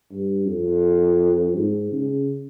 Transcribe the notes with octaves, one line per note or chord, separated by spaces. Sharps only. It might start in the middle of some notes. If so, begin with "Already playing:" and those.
G2
F2
G#2
C#3